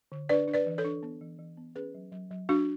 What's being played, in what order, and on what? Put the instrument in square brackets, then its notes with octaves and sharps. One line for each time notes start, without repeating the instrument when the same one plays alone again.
[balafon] D3
D4 B4 D5
D4
B4 D5
E3
A4 C#5
D4
B3
E3
E3
B3
C#4 G#4 B4
F#3
F#3
F#3
F#3 D4 F#4